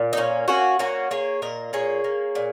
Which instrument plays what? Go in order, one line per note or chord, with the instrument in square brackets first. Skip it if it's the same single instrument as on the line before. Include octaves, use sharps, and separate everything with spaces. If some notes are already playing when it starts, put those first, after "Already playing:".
Already playing: [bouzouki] A#2
D#4
A#3 C#4
A#3 C#4 F#4
A#3 C#4 F#4
A#3 G#4 C#5
A#2 A#4 D#5
A#3 G#4 C#5
A#3
A#2